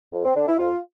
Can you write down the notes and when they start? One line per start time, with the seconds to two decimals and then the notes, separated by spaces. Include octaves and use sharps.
0.13 F2
0.25 C4
0.36 D3 D4
0.48 E4
0.58 F2 F4